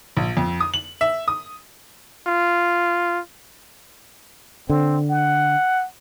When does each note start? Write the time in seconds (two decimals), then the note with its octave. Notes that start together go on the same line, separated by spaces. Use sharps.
0.17 A#1
0.37 F2
0.60 D#6
0.74 F#7
1.01 E5
1.28 D#6
2.27 F4
4.70 D3 C4
5.10 F#5